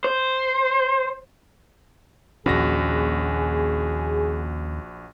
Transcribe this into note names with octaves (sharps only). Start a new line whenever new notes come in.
C5
A#1 D#2 C#4 F#4 G#4 A#6